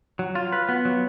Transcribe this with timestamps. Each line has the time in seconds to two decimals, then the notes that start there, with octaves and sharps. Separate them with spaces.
0.19 F#3
0.35 F4
0.52 B4
0.69 B3
0.85 F#3